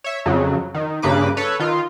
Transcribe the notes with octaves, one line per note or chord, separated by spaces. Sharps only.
C#5 E5
F2 C#3 F#3
D#3
G2 C#3 A#3 B4 D6
A4 B4 C#5
D#3 F4